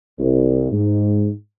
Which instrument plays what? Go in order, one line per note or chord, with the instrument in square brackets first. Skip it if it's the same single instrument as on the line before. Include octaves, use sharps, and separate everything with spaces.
[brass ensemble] C2
G#2